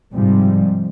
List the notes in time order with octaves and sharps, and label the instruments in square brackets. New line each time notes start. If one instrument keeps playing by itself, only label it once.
[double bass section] G#2 C3 F3 G3